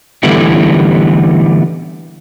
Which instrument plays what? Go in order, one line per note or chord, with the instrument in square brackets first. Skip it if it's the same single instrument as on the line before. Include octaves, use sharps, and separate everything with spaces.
[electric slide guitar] D3 E3 G3 A3 B3 E4